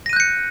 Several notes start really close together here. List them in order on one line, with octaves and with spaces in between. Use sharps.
A#6 D#7 F#6 G6 C#7